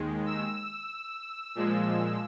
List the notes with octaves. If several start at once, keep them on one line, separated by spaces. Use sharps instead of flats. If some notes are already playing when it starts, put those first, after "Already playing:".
Already playing: D#2 D#3 G#3
E6
A#2 F3 G#3